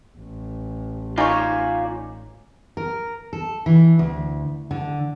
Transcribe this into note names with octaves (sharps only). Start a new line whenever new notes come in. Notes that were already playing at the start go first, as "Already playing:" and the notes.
A1
D#4 F4 C#5 D5 G#5
A#4
A4
E3
D2
D3